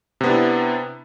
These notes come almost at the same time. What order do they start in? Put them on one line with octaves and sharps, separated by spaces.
C3 B3 D4 E4